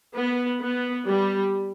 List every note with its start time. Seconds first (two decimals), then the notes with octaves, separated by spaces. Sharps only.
0.14 B3
0.60 B3
1.07 G3